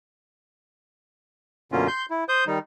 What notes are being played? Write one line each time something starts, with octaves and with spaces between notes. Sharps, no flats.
F#2 B2 D3 A#3 C#4 F4
C6 G6
E4
C5 D#6 G6
D#3 G3 D#4